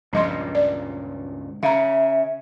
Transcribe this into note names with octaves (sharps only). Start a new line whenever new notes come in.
C#2 G2 A#2 F3 D#5 C6
D5
C#3 E5 F5 A#5